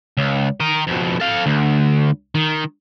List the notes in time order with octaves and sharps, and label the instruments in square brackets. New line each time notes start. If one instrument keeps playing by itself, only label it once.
[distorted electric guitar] C#2
A#4 D#5
F2 B2
A4 F5
D2
D#3